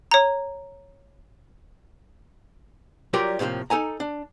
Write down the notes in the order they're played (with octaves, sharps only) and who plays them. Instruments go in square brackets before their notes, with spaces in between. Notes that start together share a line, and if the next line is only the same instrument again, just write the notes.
[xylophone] C#5 A#5
[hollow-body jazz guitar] F#3 G3 F4 G4 A#4 D5
A2 C3 F3 A3 A#3
D#4 A4 G#5 A#5
D4